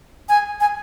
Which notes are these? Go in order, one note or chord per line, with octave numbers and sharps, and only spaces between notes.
G#5
G#5